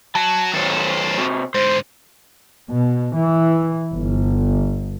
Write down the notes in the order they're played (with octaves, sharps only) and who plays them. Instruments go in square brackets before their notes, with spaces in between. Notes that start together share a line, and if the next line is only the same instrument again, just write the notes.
[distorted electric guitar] F#3 F#4 [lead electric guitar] A5
[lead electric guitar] D#3 F#3 [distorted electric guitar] A4 C5
[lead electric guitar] C3 F#4
[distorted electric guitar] G#2 D3 [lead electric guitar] C5
[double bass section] B2
E3
G1